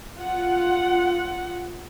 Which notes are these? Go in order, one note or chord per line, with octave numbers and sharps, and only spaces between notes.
F4 F#5